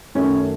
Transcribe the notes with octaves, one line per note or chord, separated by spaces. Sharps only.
F#2 D#3 A3 C#4